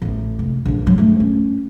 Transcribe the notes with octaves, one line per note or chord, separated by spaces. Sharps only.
A1 A2
F1
A#1 D3
G2 F#3
G2 A3
C#4